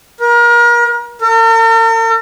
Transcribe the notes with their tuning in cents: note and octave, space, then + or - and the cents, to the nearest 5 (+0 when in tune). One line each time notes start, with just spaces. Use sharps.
A#4 +35
A#4 -45